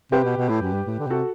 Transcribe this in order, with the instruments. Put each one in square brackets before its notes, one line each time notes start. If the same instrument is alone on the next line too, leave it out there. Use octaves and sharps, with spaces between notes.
[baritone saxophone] C3 [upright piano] G4 B4
[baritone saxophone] B2
B2
A2
F#2
G2
A2
D3
B2
[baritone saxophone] C3 [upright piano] F#4 A4